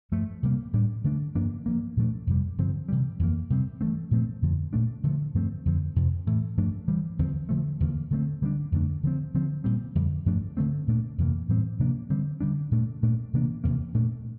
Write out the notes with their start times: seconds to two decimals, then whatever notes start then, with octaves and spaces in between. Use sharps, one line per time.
0.12 G2 F3 A3
0.43 C3 G3 A#3
0.73 A2 G3 D4
1.04 D3 A3 D4
1.35 G2 F3 A#3 D4
1.66 G2 F3 A#3
1.97 A#2 F3 A3 D4
2.27 F2 C3 G3
2.58 G2 D3 F3 C4
2.89 C3 E3 G3
3.19 F2 E3 A#3
3.50 C3 G3 C4
3.81 G2 E3 A3 C4
4.11 A#2 F3 A3 C4
4.42 F2 D3 F3
4.73 A#2 A3 D4
5.04 D3 F3 A3
5.34 G2 F3 A3 C4
5.65 F2 D3 F3 C4
5.96 F2 C3 F3
6.27 A2 E3 A3
6.57 G2 F3 A3 D4
6.88 G2 E3 G3
7.19 E2 D3 F3 C4
7.49 D3 F3 A3
7.80 E2 D3 F3 A#3
8.11 D3 A3 C4
8.42 D3 G3 A#3 D4
8.72 F2 D3 A3 D4
9.03 D3 F3 C4
9.34 D3 F3 C4
9.64 A#2 G3 C4
9.95 F2 D3 G3
10.26 G2 F3 A3 D4
10.57 D3 A3 C4
10.87 A#2 A3 D4
11.18 F2 C3 E3 A#3
11.49 A2 E3 G3 C4
11.79 C3 F3 A#3 D4
12.10 D3 G3 C4
12.41 D3 G3 D4
12.71 A#2 A3 D4
13.03 A#2 A3 D4
13.33 C3 E3 A#3 D4
13.64 E2 C3 F3 A#3
13.94 A#2 A3 D4